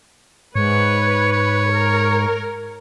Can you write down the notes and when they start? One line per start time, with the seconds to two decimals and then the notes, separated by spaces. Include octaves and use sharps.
0.56 G#2 B4 C#5
1.32 C#5
1.72 A#4